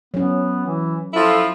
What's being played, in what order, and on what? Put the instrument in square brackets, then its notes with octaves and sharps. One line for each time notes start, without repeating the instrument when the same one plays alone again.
[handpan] F#3 C#4 [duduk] B3
[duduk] E3
[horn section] F3 E4 F4 [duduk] A4